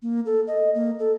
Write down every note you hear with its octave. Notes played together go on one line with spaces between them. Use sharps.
A#3
A4
D#5
A#3
A4